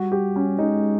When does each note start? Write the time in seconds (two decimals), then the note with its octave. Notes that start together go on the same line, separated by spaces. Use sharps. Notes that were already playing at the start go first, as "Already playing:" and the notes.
Already playing: G3 F#4
0.12 G4
0.36 C#4
0.59 G#3 D#4